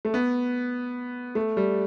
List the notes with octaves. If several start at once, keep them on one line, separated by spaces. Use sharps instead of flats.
A3
B3
A3
G3